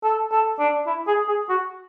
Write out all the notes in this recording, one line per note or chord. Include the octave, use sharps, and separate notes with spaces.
A4
A4
D4
E4
G#4
G#4
F#4